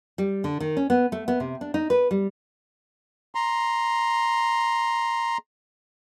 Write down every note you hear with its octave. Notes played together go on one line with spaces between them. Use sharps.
G3
D3
D#3
C#4
B3
A3
B3
C3
D4
D#4
B4
G3
A#5 C6